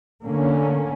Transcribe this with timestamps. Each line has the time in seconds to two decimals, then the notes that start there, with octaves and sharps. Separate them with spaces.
0.23 D3 A#3 C#4